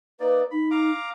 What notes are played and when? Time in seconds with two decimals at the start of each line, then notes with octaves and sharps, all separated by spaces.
0.20 A#3 D#4 B4 D5
0.51 D#4 B5
0.71 F5 A#5 D6